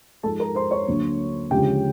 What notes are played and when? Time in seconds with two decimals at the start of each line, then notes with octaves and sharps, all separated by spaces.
0.23 G#2 F3 G#3 A4 A5
0.40 A#4 A#5
0.55 C5 C6
0.71 C#5 C#6
0.88 D2 D3 F#3 A#3
1.51 D2 C#3 F3 G#3 C#4 G4 G5